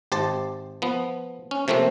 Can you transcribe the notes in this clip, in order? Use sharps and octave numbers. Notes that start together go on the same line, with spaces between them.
G#1 G4 C5 A5
F3 B3
C#4
C3 F3 A3 A#3 C4